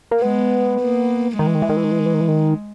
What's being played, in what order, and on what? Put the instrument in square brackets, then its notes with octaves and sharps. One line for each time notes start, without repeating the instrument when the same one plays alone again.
[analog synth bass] A#3
[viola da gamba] G#3 [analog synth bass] B3
[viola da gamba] A#3
[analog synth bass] D#3 [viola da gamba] G#3
[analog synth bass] E3
D#3
E3
D#3
E3
D#3
E3
D#3
E3
D#3
E3
D#3